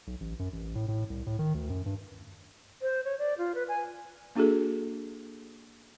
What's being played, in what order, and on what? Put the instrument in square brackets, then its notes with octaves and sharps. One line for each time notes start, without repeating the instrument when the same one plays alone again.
[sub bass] B1
A1
F#2
A1
A2
A2
C2
A2
D#3
D2
F#2
G2
[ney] C5
C#5
D5
F4
B4
G#5
[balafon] A#3 D4 F#4 G#4 A4